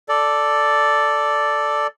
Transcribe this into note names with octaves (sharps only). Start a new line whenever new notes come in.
A4 D5